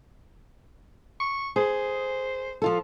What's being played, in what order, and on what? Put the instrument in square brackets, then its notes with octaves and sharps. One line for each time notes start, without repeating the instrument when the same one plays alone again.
[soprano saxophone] C#6
[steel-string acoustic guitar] G#4 [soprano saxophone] C5
[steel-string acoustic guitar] F3 F4 A4